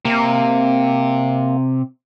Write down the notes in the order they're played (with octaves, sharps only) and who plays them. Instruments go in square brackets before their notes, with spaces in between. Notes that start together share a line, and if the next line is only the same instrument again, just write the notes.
[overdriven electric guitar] C3 [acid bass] A#3